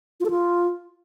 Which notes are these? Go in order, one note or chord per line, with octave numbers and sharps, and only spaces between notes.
F4
A4
F4